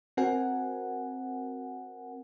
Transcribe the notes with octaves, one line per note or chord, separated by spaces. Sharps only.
C4 F#4 A#4 F#5 G#5